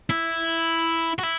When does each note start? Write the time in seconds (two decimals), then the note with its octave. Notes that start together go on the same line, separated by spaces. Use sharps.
0.10 E4
1.19 F#4
1.23 E4